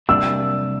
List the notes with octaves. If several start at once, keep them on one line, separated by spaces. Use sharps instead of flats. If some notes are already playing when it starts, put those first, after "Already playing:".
C3 G3 A#3 D4 G4 E6